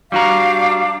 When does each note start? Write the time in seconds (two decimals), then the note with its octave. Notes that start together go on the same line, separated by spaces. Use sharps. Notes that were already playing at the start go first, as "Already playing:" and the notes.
0.12 G3 D4 F#4 F5 A#5 D6